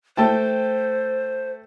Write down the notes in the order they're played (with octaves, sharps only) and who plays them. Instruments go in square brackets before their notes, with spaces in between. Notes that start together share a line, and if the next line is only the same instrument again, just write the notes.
[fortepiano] A3 G5 A5 [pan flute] C5